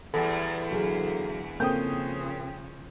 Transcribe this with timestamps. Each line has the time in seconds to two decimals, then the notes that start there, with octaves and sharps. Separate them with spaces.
0.14 E2 G3 A4
0.71 D3 F#3 A#3 G#4
1.60 C#3 F3 A#3 C4 A4 G5 D#6 G6